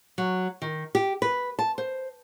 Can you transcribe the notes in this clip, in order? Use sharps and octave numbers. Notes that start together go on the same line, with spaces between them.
F#3
D#3
G4
B4
A5
C5